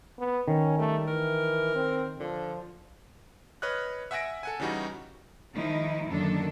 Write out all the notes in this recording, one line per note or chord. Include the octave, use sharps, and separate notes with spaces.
B3
D#3 C#4
G3 A3
E3 A#4
C4
D3 F3
B4 C#5 D#5 F6 F#6
E5 F#5 G#5 E6 A#6 D7
A4 F#5 G#5
C#3 E3 G3 D#4 F#4
D#3 F3 G#3 D#4 E4
F#2 D3 D#3 A#3 D4 A4